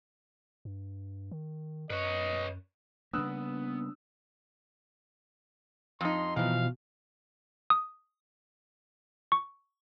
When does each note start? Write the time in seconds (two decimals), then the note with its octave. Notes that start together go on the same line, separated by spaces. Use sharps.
0.65 G2
1.31 D#3
1.90 F#2 B4 C#5 D#5
3.13 C#3 G3 A#3 B3 D4 D#6 E6 F#6
6.01 F2 D#4 C6
6.36 B2 E3 F3 F5
7.70 D#6
9.32 C#6